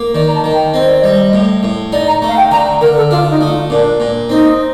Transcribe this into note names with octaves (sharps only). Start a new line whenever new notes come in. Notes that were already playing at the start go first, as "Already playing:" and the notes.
Already playing: A#3
D#3 D5
A#5
A5
D#3
G5
C4 D#5
D5
G3 D#5
A2
A2
D#4 D5
A#5
A3
F5
G5
D3 A#5
D3 A#4
A4
D4 F4
F4
D#4
A3
F4
A#2 D4
A#2
C4 D#4